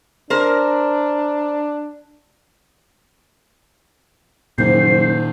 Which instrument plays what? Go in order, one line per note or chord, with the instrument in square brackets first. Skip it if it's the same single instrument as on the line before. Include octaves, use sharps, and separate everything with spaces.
[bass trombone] D4 [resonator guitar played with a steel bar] A#4 C5
[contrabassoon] F#1 [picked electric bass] A#2 D#3 [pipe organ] C5 [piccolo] C7